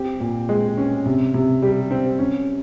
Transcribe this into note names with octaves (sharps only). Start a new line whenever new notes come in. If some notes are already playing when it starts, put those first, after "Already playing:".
Already playing: C4 G4
A#2
G#3
C#4
C3
C3
G3
C4
C#4